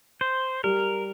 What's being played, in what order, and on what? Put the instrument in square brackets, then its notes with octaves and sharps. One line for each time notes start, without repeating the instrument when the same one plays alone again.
[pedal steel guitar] C5
[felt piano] G3 [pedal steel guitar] A#4